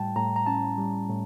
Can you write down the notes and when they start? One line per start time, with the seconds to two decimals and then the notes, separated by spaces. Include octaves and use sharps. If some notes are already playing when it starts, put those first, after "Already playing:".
Already playing: A2 G3 G5 A5
0.16 A2 A#5
0.36 A#5
0.47 C#4 A5
0.78 G3
1.10 A2